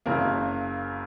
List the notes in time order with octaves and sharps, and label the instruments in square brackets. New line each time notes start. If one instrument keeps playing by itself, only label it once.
[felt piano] F#1 F#2 C#3 F#3 A#3 A#4